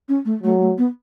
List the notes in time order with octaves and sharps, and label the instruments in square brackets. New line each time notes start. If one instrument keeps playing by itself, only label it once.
[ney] C#4
A3
[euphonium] F#3 [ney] A3
[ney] A3
B3